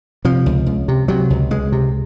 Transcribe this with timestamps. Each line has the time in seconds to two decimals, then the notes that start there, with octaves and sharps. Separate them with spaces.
0.25 C3 F3
0.46 C#2
0.66 C#2
0.88 C3
1.08 C3 F#3
1.30 C#2
1.51 C#2 G#3
1.72 C3